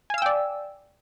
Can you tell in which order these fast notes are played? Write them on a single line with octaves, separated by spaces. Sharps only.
G#5 F5 E6 G5 D5